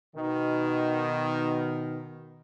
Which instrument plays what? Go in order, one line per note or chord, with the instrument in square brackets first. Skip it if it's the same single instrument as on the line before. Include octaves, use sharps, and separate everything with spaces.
[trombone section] B2 D#3